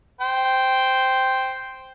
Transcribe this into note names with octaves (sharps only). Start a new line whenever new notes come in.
C5 G5